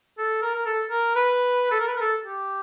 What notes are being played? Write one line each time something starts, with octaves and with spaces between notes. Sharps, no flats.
A4
A#4
A#4
A4
A#4
B4
A4
A#4
B4
A#4
A4
G4